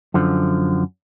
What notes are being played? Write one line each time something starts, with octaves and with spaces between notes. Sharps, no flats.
F#2 D3 F3